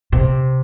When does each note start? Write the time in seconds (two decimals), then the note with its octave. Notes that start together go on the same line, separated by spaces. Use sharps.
0.12 C3